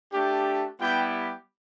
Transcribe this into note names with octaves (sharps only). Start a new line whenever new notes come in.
A3 D4 G4
G3 B3 E4 G4 G5